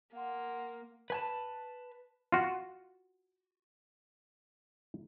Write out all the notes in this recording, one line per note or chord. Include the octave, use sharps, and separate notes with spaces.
A#3 F5 F#5 C6
B4 G#5 A5
F4 F#4